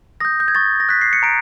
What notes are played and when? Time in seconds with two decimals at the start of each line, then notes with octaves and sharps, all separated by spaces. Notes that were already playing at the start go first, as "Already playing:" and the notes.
0.20 D#6 G6 A#6
0.40 G6
0.48 G#6
0.55 C#6 A6
0.80 A#6
0.89 F#6 B6
1.01 C7
1.13 C#7
1.23 A#5 D7